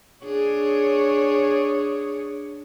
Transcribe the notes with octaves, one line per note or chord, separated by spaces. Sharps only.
D4 G#4 C#5